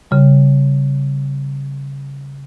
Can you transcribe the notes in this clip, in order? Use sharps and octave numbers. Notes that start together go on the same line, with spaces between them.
C#3 G3